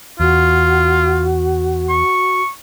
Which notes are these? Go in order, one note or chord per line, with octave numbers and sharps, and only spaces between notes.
E2 F4 F#4
C#6